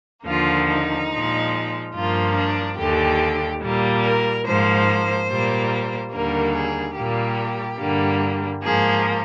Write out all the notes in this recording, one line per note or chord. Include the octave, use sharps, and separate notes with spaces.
D#2 D3 F3 A#3 F4
D#4
A#2 F3 G#3
G2 F3 A#3 F4
D4
D#2 D3 G3 G4
A#2 G3 A#3
A#4
G#2 F3 A#3 C5
A#2 G3 A#3
D#2 D3 G3 A#3 A#4
G#4
A#2 G3 A#3 G4
G2 D3 G3 A#3
G#2 F3 A#3 G#4